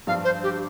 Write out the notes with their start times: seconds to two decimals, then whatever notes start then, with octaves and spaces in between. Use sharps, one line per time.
0.07 G2 F3 D4 F5
0.24 C5
0.43 G4